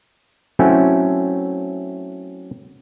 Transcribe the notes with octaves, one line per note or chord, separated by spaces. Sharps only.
F#3 A3 C4 C#4 E4